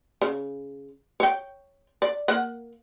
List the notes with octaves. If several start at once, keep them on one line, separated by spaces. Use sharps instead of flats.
C#3
C#5 G5
D5
A#3 F#5